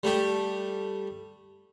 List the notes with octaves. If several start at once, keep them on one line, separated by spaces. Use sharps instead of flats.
G3 A3 G4